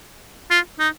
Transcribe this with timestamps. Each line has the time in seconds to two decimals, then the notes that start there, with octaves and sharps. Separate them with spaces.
0.50 F4
0.79 D#4